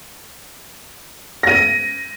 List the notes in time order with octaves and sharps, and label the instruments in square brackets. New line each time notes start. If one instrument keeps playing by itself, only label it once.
[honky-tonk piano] A#6 D#7